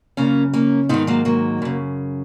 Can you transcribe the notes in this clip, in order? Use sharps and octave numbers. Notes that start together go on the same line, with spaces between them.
F#2 C#3 A#3 C#4
A#3 C#4
G#2 D#3 B3 D#4
F#3 A#3
F#3 A#3
F#2 C#3